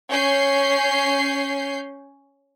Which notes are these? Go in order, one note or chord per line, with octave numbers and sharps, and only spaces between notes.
C#4 G6 C7